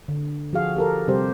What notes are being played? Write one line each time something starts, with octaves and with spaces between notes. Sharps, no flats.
D3
F3 F#4 G#4 F5
G4 A4 A#4
C3 G3 G4 C5